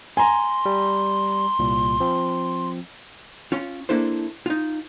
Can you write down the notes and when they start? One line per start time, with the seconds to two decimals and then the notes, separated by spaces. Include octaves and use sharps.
0.17 G#5 A#5 C6
0.66 G3
1.59 C2 A#2
2.00 F3 C4
3.52 C#4 F4
3.89 A#3 D4 E4 A4 C5
4.46 D#4 F4